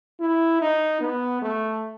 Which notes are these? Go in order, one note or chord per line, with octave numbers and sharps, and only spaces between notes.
E4
D#4
B3
A3